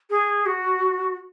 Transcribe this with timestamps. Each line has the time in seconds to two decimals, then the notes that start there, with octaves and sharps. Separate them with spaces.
0.10 G#4
0.45 F#4